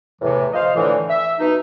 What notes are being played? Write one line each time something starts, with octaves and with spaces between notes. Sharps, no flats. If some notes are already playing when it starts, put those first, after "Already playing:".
E2 A2 C3 E3
F3 F4 C5 D#5 F5
A2 D3 E3
E5
B2 D#4